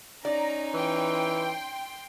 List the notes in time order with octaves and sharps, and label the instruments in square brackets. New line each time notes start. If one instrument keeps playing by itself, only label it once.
[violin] C#4 D#4 [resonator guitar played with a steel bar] D5 [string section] A#5
[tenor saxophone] E3 [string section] G5 C6